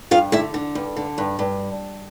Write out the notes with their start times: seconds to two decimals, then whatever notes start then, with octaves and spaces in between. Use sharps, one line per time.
0.11 G2 F4 F5
0.32 D3 E4 E5
0.54 D3
0.75 G2
0.96 D3
1.18 G2
1.39 G2